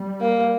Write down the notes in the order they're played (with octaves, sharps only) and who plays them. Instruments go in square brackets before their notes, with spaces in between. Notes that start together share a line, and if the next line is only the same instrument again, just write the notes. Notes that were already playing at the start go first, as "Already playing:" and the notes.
Already playing: [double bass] G3
[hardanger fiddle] A#3